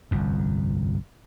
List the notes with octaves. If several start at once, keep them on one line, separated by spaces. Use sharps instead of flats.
G1 C2 F2